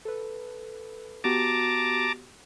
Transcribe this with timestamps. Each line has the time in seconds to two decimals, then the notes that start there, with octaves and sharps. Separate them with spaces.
0.05 A4 B4
1.24 B3 F#4 G4 A5 A#5 D6